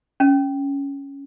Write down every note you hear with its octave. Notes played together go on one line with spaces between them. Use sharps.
C#4